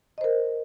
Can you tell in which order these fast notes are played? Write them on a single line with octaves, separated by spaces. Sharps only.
D#5 C5 A#4